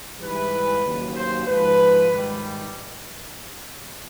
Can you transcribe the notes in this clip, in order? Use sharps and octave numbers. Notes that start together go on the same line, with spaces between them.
G#2 E3 G3 B4
D#2 C#3 F#3
C5
G#2 F3 B4
G#2 D#3 G3